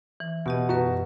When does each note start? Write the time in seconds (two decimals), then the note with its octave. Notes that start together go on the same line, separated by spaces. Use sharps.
0.20 E3
0.46 B2 B3 G4 D#5
0.69 F#2 F#4 B4